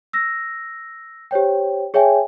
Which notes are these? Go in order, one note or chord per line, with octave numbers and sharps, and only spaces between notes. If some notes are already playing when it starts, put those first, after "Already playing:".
E6 A#6
G4 C5 C#5 G5
G#4 C#5 E5 G5 G#5